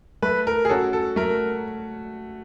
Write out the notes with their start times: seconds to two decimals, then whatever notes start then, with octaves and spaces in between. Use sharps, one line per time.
0.22 A3 B4
0.47 A#4
0.65 G#4
0.69 C#4 F#4 A4
0.93 A4
1.16 A3 A#4